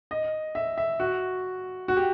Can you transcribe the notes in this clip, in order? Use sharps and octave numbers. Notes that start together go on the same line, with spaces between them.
D#5
E5
E5
F#4
F#4
G4